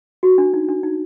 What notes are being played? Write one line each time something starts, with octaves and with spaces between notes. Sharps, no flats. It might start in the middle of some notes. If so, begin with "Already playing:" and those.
F#4
D4
D#4
D4
D#4